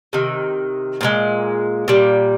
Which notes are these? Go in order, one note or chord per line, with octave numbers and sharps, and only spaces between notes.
C3 D#3
A#2 F3 G#3
A#2 G3